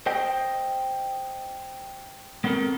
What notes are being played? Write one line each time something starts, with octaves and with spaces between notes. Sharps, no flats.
C5 D#5 G5
G#3 B3 C4 A4 A#4